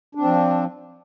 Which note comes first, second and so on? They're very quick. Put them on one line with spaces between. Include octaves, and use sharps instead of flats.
D4 C4 F3